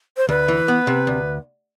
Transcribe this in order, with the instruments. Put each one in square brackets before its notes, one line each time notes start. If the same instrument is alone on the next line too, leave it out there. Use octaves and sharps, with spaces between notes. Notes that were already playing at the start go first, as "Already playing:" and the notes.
[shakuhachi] C5
[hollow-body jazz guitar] D2 [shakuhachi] B4
[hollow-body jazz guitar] E3
B3
C3
D2